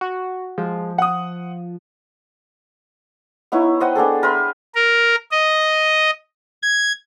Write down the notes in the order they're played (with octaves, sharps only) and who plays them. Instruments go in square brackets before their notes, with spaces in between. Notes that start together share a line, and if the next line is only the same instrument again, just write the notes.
[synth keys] F#4
[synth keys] F3 [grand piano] G#3
[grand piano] F#5 D#6
[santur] B3 D#4 E4 C#5
C5 D#5 F#5 G5
B3 D4 G#4 A4
A#4 B4 E5 C6
[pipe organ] A#4
D#5
G#6